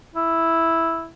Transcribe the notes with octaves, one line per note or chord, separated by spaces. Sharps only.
E4